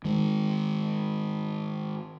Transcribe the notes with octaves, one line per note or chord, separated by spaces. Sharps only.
D#3 G#3